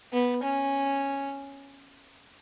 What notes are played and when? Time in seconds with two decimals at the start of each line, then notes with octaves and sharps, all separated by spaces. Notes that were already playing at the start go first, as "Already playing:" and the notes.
0.13 B3
0.43 C#4